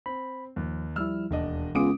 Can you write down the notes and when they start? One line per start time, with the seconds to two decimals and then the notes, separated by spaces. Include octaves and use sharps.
0.06 C4 B5
0.56 D#2 F3
0.96 F3 G3 E4 E6 F6
1.31 E1 D#2 D4 D#5
1.75 C#2 B3 F4 G#4 D6 D#6 D7